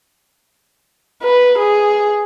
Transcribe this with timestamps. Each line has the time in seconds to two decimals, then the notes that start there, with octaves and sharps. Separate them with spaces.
1.23 B4
1.58 G#4